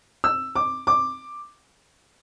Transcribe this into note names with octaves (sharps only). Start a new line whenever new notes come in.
E6
D6
D6